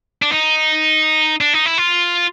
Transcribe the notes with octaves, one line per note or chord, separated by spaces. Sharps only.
D4
D#4
D4
D#4
E4
F4